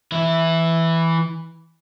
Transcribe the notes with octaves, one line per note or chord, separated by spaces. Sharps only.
E3 E4